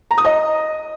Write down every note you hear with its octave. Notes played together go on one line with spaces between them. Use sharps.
A#5
D#6
D#5